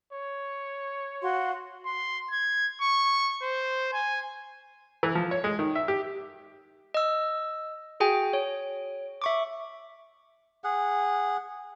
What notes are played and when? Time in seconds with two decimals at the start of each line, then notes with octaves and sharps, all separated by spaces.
0.12 C#5
1.22 F#4 F5 C6
1.86 C6
2.31 G#6
2.82 C#6
3.43 C5
3.93 G#5
5.03 E3
5.15 F3
5.31 C#5
5.44 G#3
5.59 D#3
5.75 E5
5.88 G4
6.94 D#5 E6
8.00 F#4 G#4 G5 G#5
8.33 C#5
9.22 E5 C#6 D6
10.64 G#4 F#5